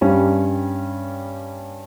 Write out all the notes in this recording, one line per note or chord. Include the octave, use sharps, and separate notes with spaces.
G2 G3 C#4